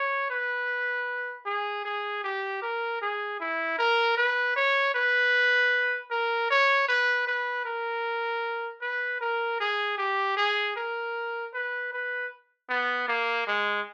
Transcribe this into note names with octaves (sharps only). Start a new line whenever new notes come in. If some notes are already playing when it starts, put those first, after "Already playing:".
Already playing: C#5
B4
G#4
G#4
G4
A#4
G#4
E4
A#4
B4
C#5
B4
A#4
C#5
B4
B4
A#4
B4
A#4
G#4
G4
G#4
A#4
B4
B4
B3
A#3
G#3